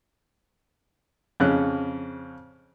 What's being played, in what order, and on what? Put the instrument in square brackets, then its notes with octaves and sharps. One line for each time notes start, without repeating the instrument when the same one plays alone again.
[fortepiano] F2 C#3 C#4 F#6